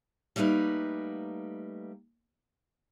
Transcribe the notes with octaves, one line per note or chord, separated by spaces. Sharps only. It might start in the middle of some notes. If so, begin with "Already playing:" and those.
G3 A3 A#3 D#4 B4